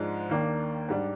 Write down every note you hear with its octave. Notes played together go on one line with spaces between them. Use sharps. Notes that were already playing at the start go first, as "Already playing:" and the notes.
Already playing: G#2 F3 G#3 D4
D#2 D#3 A#3 D4
G#2 G3 D4